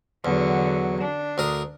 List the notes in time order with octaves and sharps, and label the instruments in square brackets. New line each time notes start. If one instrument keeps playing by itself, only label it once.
[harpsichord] E2 [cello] D3 F#3
[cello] D4
[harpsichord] D2 A#4 D#6